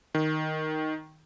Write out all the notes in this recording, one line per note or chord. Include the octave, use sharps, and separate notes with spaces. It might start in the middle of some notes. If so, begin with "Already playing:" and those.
D#3